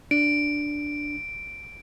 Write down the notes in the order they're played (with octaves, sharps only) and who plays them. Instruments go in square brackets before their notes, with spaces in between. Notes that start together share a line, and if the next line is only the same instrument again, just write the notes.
[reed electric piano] D4 [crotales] D7